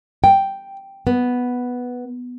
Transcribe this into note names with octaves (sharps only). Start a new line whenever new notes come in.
G5
B3